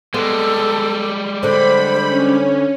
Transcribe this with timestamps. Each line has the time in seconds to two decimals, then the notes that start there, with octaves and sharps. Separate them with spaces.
0.14 G3 G#3 B3 A4
1.43 D3 C4 C5 B5
2.09 C#4